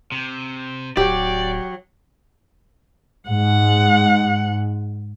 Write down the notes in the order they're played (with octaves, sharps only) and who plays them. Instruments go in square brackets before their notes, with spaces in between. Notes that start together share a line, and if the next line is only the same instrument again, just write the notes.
[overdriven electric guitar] C3
[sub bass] D1 [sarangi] F#3 [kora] G4 [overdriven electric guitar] D5
[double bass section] G#2 [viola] F#5